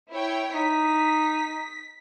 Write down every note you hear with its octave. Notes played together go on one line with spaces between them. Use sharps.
E4 C#5 G5
D#4 B6